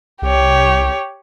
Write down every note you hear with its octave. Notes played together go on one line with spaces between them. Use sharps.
C2 G4 C#5